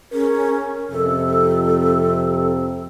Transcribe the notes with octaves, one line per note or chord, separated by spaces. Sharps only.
C#4 G#4 A#4
F2 C3 A4